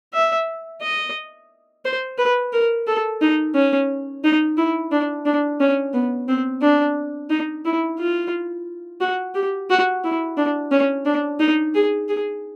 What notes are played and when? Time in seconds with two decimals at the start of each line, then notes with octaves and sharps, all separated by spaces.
0.13 E5
0.81 D#5
1.85 C5
2.18 B4
2.52 A#4
2.87 A4
3.21 D#4
3.55 C#4
4.24 D#4
4.57 E4
4.91 D4
5.25 D4
5.60 C#4
5.93 B3
6.28 C4
6.62 D4
7.30 D#4
7.65 E4
7.99 F4
9.00 F#4
9.34 G4
9.70 F#4
10.04 E4
10.37 D4
10.71 C#4
11.05 D4
11.40 D#4
11.74 G#4
12.09 G#4